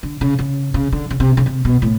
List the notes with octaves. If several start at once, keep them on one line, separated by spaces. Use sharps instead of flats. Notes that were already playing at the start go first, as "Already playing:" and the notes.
D3
C#3
C#3
C#3
D3
C#3
C3
C#3
C3
B2
A2